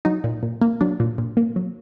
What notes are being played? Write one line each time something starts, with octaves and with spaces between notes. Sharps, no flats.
F#3 D#4
A#2
A#2
A#3
F#3 D4
A#2
A#2
A#3
F#3